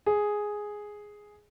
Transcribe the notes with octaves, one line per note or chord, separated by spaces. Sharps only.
G#4